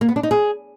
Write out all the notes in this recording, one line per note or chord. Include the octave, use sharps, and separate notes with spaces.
A#3
B3
D4
D#4
G#4